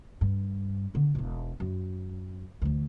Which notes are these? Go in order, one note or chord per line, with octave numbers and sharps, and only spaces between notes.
G2
D3 D#3
E1 A#1
F#2
D2 E3